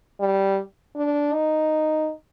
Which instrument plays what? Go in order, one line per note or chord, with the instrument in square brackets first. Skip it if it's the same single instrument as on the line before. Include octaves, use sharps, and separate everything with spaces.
[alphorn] G3
D4
D#4